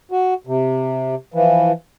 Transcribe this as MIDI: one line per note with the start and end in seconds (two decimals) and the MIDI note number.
0.12 0.34 66
0.47 1.15 48
1.34 1.72 52
1.34 1.72 53